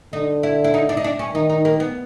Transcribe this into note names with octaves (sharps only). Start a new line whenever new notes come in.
D3 D#4
E4
E4
D#4
D4
D#4
D4
C#4
D#3 D#4
D#4
A#3
B3